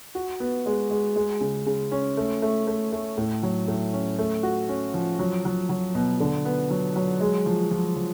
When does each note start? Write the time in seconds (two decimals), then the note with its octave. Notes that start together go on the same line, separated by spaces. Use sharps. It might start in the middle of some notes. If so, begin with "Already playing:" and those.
0.15 F#4
0.40 B3
0.66 G#3
0.90 G#3
1.16 G#3
1.41 C#3
1.66 C#3
1.92 C#4
2.17 A3
2.42 A3
2.67 A3
2.92 A3
3.18 A2
3.43 F#3
3.68 A2
3.93 C#4
4.19 A3
4.43 F#4
4.69 C#4
4.94 F3
5.19 F#3
5.45 F#3
5.69 F#3
5.95 B2
6.20 D3
6.45 B3
6.70 F#3
6.96 F#3
7.20 G#3
7.46 F3
7.71 F3
7.96 F3